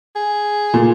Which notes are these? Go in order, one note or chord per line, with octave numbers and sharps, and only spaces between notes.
G#4
A#2